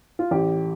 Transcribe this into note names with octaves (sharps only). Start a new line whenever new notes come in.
F4
A1 G4